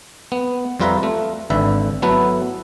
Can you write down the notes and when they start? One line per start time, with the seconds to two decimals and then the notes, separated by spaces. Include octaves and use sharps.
0.32 B3
0.80 F2 G3 F4 B4 E5 A#5
1.03 A3
1.50 G#1 D3 B4 E5
2.02 F#3 A3 B3 E4 A4 B4